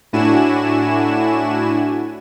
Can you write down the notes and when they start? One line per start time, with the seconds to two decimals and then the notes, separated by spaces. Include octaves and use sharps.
0.13 A2 D4 E4 F#4 G#5 E7